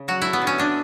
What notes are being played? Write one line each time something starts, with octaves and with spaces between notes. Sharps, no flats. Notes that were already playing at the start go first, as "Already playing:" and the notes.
Already playing: C#3
F#3 F#4
A3 E4
B3
D3
C#4
D3 D4